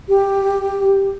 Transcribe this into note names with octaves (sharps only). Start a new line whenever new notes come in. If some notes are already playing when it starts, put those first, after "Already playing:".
G4